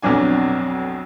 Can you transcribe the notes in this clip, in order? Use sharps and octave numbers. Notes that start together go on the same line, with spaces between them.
B1 F2 F#3 D4 G#5